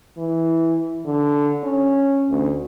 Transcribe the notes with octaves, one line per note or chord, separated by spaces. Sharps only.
E3
D3
C#4
D2